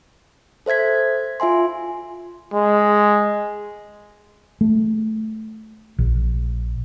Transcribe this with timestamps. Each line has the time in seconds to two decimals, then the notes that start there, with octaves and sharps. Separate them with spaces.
0.66 A4 C5 E5 G#6 B6
1.40 F4 E5 G#5 C6
2.53 G#3
4.61 A3
5.99 A#1